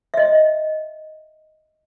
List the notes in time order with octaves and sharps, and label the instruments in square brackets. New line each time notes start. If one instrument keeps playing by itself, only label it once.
[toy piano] D#5 E5